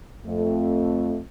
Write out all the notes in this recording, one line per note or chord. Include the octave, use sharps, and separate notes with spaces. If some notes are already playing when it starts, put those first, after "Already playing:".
F2 A3